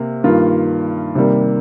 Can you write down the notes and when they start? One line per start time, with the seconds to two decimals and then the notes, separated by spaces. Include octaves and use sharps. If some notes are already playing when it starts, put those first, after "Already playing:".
Already playing: C3 A#3
0.24 G2 D#3 A#3 F4
1.15 C3 D#3 G3 A#3